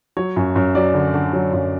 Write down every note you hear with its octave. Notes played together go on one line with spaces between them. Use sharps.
F#3 C#5
F#2
F#2
F#3 D5
D3
D3
F#3
F#2